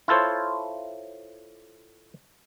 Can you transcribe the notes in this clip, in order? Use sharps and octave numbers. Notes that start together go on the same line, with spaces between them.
E4 F4 A4 C5 C#5